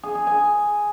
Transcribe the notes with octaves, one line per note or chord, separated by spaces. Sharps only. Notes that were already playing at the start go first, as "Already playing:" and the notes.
G#4
G#4
G#5